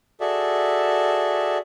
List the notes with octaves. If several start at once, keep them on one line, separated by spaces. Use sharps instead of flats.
F#4 G#4 A4 D5 E5